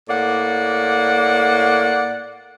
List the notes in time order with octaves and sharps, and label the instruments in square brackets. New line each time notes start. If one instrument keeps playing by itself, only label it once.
[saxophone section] A2 A#3 D5 F#5